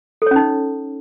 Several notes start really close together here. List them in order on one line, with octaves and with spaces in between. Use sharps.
A4 C#5 C#4 D#4